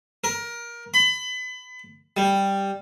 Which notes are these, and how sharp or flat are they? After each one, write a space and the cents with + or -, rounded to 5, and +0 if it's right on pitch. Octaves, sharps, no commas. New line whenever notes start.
A#4 +20
B5 +30
G3 +5